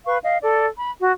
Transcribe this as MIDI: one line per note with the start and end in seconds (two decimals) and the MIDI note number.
0.06 0.17 71
0.06 0.17 77
0.06 0.17 85
0.24 0.37 75
0.24 0.37 77
0.42 0.65 69
0.42 0.65 74
0.78 0.91 83
1.00 1.11 66